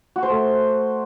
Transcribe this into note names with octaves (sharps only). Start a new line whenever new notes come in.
F#4
C5
A3